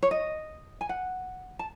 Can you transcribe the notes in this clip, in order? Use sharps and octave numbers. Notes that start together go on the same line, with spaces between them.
C#5
D#5
G#5
F#5
A5